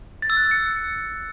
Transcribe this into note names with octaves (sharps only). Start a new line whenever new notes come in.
A6
E6
F#6
A6
C#7